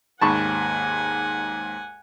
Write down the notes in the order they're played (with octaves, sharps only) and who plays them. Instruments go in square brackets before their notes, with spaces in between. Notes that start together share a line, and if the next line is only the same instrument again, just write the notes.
[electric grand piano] D#2 G#2 [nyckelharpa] F#5 G#5 [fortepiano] A5 B5 C#6